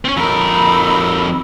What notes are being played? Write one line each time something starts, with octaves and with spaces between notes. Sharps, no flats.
C4 C#4
F2 D#4 A#4 B5 E6